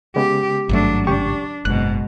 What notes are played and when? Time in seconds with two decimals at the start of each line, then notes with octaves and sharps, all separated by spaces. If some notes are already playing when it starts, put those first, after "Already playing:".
0.16 C#3 G#3 B3 G4
0.69 G#1 G2 F#3 A3 D4
1.07 C#2 D4 G4 C#6
1.65 F#1 G#2 B2 F#6